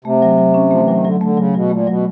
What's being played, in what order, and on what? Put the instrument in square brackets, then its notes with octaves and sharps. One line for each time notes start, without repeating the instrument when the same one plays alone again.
[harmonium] C3 [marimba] A3
[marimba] F#3
F#3
C#4
[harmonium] F3 [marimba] A3
[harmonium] E3
[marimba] F#3
[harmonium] D#3
[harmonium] D3 [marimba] F#3
[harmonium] D3 [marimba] A3
[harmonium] C#3 [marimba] F#3
[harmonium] B2 [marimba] F#3
[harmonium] A#2 [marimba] A3
[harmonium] B2 [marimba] F#3